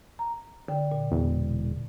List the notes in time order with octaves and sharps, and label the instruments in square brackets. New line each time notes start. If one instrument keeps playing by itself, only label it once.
[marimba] A#5
D3 G5
A#2
[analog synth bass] E1